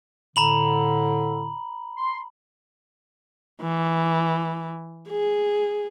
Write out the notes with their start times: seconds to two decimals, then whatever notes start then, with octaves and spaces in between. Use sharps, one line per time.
0.36 A2 D3 A#5 B5 F#7
1.97 C6
3.61 E3
5.09 G#4